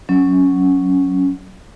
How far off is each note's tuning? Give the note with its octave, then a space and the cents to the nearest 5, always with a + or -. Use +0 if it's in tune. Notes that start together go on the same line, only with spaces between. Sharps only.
F#3 +0 C#4 +0